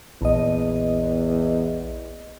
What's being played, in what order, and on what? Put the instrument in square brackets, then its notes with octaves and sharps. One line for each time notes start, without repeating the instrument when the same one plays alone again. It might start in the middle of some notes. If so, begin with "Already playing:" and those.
[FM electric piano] A#1 D#5 [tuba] E2